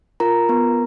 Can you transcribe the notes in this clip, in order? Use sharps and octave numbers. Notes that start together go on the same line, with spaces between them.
F4 A#4 A#5
B3